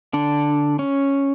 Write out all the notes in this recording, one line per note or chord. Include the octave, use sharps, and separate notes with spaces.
D3 D4
C#4